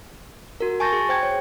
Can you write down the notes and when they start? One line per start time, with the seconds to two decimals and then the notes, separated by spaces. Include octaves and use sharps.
0.60 F#4 A#4
0.80 G#5 A5 C#6 G6 A6 A#6
0.93 G#4
1.09 C5 G5 G#6
1.23 C#5